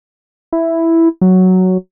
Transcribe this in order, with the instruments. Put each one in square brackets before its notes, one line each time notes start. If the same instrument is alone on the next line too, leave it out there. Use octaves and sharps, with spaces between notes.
[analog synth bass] E4
F#3